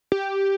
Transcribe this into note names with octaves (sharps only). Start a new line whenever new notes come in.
G4